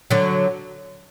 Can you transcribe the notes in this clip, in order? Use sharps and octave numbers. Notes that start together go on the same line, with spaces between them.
D3 F#3